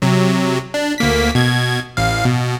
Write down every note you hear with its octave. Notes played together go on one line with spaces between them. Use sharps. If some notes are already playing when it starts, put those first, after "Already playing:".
C3 F#3
D4
D2 A#3 B6
B2 G#6
A1 F5
B2